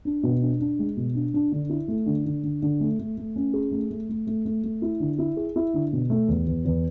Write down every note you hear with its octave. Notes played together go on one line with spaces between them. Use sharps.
D4
B2
D4
D4
G#3
B2
D4
D4
D3
E4
A3
D3
D3
D3
D3
A3
A3
A3
C#4
G#4
A3
A3
A3
A3
A3
A3
E4
D3
E4
G#4
E4
D3
B2
A3
E2
E2
E2